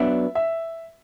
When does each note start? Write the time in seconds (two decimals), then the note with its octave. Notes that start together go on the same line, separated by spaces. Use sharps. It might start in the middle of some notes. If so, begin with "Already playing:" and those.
Already playing: F#3 B3 D4 E5
0.35 E5